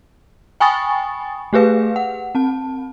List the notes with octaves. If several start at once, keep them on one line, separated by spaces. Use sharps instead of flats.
G5 G#5 B5 C#6 D#6 A6
A3 G4 G#4 B4 F5
F#5
C4 A5